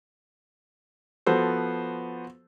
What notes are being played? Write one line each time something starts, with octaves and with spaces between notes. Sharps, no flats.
F3 B3 F#4 A4 C5